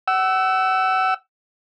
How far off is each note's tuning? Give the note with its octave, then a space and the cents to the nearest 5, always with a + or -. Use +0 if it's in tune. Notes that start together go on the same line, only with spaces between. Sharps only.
F#5 +35 E6 +0